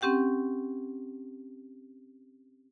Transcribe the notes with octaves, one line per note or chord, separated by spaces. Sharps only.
C4 C#4 G4 F#5 G5